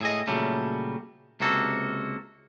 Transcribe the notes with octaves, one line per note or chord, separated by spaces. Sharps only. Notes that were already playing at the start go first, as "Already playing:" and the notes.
A2 G#4 D#5
A#2 C#3 F#3 G3 A3
C#2 C3 A#3 F#4 A4